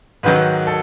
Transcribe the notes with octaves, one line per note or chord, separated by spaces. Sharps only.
G#2 D#3 F#3 B4
A4